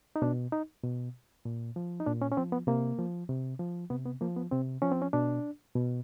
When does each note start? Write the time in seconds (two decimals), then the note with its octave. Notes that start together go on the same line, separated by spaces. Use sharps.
0.16 D#4
0.22 B2 D4
0.52 D#4
0.84 B2
1.45 A#2
1.76 F3
2.00 D#4
2.07 A#2 D4
2.22 C#4
2.32 C#4
2.37 F3 C4
2.52 B3
2.67 C3 A#3
2.98 F3
3.29 C3
3.59 F3
3.90 C3 B3
4.05 B3
4.21 F3 A#3
4.36 B3
4.51 C3 C4
4.82 F3 C#4
4.92 C4
5.02 C#4
5.13 B2 D4
5.75 B2